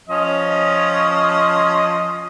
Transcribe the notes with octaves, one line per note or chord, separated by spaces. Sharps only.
F3 C#4 D#5